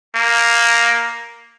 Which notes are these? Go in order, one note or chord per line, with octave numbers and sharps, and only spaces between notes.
A#3